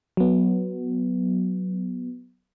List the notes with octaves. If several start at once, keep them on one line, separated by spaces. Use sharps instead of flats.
F#3 B3